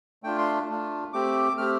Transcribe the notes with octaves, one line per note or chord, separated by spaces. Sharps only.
A3 D4 F4 G5
C6
A3 D4 F4
A3 C4 G4 D6
A3 C4 G4 F6